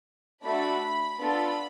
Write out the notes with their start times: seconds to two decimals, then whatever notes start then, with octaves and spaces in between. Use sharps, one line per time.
0.44 A3 D4 F#4 A4 B5
1.20 B3 D4 F4 A4 B5